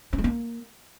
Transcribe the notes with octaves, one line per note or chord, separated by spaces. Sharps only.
C4
G#3
A#3